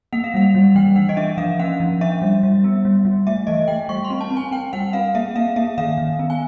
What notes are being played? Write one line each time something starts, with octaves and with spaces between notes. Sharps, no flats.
A#3 F#5
F5
G3 F#5
G3
E3 G5
E3 F#5
D#5
D4 E5
F3 F5
C#4 F#5
F3
D4 E5
G3
G3
B3
G3
G3
A3 E5
E3 D#5
A3 G5
G3 C#6
C6
C4
A5
C4
G#5
C4 G5
G3 F#5
C4 F5
A#3 E5
A#3 F5
A#3 E5
D#3 F5
D#3
B3
G#5